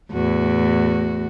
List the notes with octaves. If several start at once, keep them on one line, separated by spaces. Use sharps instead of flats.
E2 A2 F#4